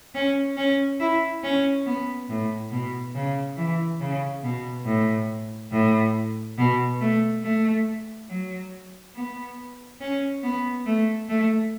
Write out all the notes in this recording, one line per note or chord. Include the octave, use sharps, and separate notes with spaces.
C#4
C#4
E4
C#4
B3
A2
B2
C#3
E3
C#3
B2
A2
A2
B2
A3
A3
F#3
B3
C#4
B3
A3
A3